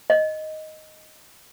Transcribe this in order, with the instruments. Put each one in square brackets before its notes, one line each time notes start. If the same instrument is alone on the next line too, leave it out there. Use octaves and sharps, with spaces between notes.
[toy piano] D#5